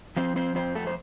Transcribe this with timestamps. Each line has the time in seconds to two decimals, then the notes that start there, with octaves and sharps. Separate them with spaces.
0.16 F3 C4 C5
0.36 C4 C5
0.55 F2 C4 C5
0.75 A3 A4
0.87 C5